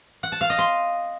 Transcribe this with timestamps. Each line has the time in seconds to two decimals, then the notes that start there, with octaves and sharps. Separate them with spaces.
0.23 F#5
0.32 A5
0.41 F5
0.50 D#5
0.58 C6